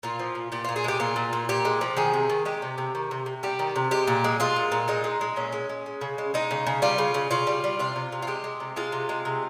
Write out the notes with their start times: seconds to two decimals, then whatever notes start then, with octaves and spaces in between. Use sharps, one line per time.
0.03 A#2 F4
0.19 F3
0.35 A#2
0.52 A#2 G4
0.64 A#2 F4
0.76 G#4
0.84 G#3 G4
1.00 A#2 F4
1.16 A#2
1.33 A#2
1.49 A#2 G4
1.65 G#3
1.81 F3
1.97 D#3 G#4
2.13 C3
2.30 D#3
2.45 G#3 G4
2.62 C3
2.78 C3
2.95 D#3
3.11 C3
3.26 C3
3.43 G3 G4
3.59 D#3
3.76 C3
3.91 G#3 G4
4.07 A#2
4.24 G#3
4.40 G#3 F4
4.56 A#2
4.72 A#2
4.88 G#3 D#4
5.04 G#3
5.21 G#3
5.36 A#2 C#4
5.52 G#3
5.69 G#3
5.86 G#3
6.01 C#3
6.18 G#3
6.34 G#3 D#4
6.51 C#3
6.67 C#3
6.82 G3 F4
6.98 C#3
7.14 C#3
7.31 C#3 F4
7.47 G3
7.64 G3
7.79 C3 F4
7.96 C3
8.12 C3
8.22 F4
8.27 G#3 G4
8.44 G#3
8.60 C3
8.76 G#3 F4
8.92 C3
9.09 G#3
9.25 C3